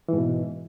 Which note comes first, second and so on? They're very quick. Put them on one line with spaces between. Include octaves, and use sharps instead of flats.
E3 G#2 B2